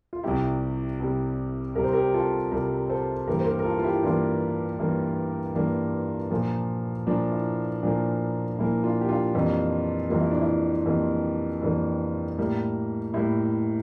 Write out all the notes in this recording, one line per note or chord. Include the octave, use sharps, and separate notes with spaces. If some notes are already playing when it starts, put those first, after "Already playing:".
F4
C2 C3 G3 E4 G4
C2 C3 G3
C2 C3 G3 A#4
C5
G4 A#4
F4 A4
C2 C3 G3 G4 A#4
A4 C5
G2 E3 A#3 G4 A#4
C5
G4 A#4
A#4
F4 A4
F4
E4 G4
G2 E3 A#3 D4 F4
G2 E3 A#3
G2 E3 A#3 D4
A#2 F3 A#3
A#2 F3 A#3 D4
E4
A#2 F3 A#3 D4
A#2 F3 A#3 E4
D4 F4
G4
D4 F4
F2 E3 G3 A#3
F2 E3 G3 A#3 F4
E4
D4
E4
F2 E3 G3 A#3
F2 E3 G3 A#3 D4
A2 G3 A#3
A2 G3 A#3 E4